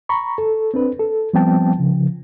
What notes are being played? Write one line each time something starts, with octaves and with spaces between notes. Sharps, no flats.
A#5 B5 C#6
A4
C4 D4 B4
A4
F3 G3 B3 C4 G5 A5
C#3 F3